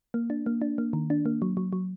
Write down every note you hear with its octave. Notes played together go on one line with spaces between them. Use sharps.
A#3
D4
A#3
D4
A#3
D#3
D4
A#3
F#3
F#3
F#3